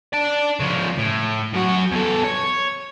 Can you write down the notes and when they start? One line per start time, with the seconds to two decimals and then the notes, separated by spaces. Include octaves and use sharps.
0.13 D5 A5
0.60 C#3 F3
0.98 A2
1.53 F#2 F#4
1.92 E2 A4
2.25 C#5